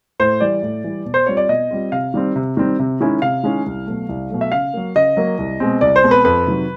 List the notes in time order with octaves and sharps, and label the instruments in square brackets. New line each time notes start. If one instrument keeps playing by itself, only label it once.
[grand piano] A2 C5
E3 G3 D5
A2
E3 G3
B2
C5
G3 C4 F4 C#5
D5
B2 D#5
G3 C4 F4
C3 F5
D#3 G3 C4
C3
D#3 G3 C4
C3
D#3 G#3 C#4 E4
C3 F5
D#3 G#3 C#4 E4
C2
B2 F#3 A3
C2
B2 F#3 A3
E5
C#3 F5
F#3 A#3
C#3 D#5
F#3 A#3
C2
B2 G#3 C4
C2 D5
C5
B2 G#3 C4
B4
F2 B4
C3 D#3 F#3